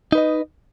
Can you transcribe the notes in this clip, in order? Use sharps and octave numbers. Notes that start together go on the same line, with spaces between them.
D#4 B4 D#5